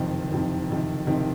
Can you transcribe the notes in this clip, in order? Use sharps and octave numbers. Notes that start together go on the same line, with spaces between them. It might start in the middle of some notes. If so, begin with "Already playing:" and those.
Already playing: F#1 F2 C3 D#3
F#1 F2 C3 D#3
F#1 F2 C3 D#3
F#1 F2 C3 D#3